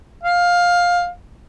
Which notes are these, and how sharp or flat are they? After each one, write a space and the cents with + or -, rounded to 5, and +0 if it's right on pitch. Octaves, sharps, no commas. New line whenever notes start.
F5 +15